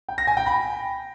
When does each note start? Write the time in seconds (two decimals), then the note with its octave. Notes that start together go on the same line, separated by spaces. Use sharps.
0.09 G5
0.18 A#6
0.27 G#5
0.37 G5
0.46 B5